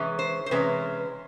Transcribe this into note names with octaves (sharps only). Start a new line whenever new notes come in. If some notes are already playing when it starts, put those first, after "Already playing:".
Already playing: C3 E3 G#3 C#4
C5
C5
C3 E3 G#3 C#4 B4